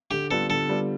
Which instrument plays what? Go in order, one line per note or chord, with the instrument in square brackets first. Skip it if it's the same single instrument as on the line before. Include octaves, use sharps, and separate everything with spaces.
[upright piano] D3 [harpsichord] G4
[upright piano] G3 B3 F4 [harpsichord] A4
[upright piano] D3 [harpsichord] A4
[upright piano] G3 B3 F4